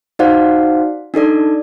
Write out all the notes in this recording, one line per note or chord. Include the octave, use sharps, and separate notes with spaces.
D#4 F#4 C5 D5 F5 F#5
D4 D#4 A4 D5